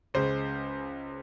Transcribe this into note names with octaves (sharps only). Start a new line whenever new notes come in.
C#2 C#3 G#3 C5